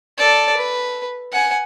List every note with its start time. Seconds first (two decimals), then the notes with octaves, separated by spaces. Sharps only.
0.18 A4 D5
0.57 B4
1.32 F#5 G#5